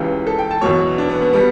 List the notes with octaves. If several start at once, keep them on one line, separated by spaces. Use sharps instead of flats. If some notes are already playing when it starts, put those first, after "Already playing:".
Already playing: C#2 C#3 E3 G4
A4
G5
A5
E2 B2 F#3 C#5
D4
B3
B3
B2 G3 B3